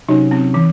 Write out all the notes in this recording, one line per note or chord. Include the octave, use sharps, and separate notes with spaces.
C3 F#3 C#4 D#4
C4
E3